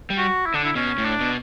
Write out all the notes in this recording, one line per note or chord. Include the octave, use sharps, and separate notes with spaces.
G3
F#4
E4
D3 D4
E4
B2 C#4
A2
D4
B2